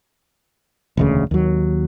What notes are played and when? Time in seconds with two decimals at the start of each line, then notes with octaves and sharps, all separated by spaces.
0.97 E1 D2 C#3
1.31 D#2 F#3